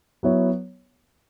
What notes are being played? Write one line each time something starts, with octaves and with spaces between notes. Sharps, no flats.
F#3 B3 E4 C#5